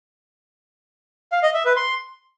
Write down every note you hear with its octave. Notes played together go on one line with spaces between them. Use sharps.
F5
D#5
E5
B4
C6